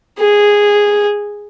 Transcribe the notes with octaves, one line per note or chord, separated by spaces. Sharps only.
G#4